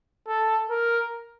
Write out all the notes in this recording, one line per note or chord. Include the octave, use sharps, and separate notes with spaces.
A4
A#4